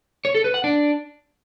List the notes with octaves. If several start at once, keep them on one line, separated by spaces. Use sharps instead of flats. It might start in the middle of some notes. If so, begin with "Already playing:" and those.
C#5
A4
B4
F#5
D4